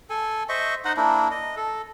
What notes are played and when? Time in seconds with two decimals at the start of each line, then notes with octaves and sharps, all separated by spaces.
0.10 A4 G#5
0.49 C5 D#5 E5 C#6
0.85 D#4 C5 D#5 F#5
0.97 A#3 D4 E4
1.31 D#5
1.57 A4